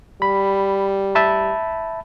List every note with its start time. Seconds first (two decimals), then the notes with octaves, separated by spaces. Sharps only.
0.22 G3 B5
1.15 E5 A5 B5